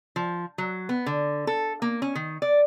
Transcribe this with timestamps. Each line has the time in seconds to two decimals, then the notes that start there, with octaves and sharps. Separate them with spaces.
0.16 F3
0.58 F#3
0.89 B3
1.06 D3
1.47 A4
1.82 A#3
2.02 C#4
2.15 D#3
2.42 D5